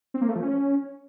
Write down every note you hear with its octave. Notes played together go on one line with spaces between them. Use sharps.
C4
A#3
A3
F3
C#4